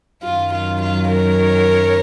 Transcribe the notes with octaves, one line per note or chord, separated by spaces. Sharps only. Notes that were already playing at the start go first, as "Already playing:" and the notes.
F#2 D#3 F#3 F4
F4
F4
A#4 C#5